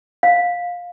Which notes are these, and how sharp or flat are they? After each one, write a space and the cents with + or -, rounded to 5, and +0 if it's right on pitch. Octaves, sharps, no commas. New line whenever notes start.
F5 +15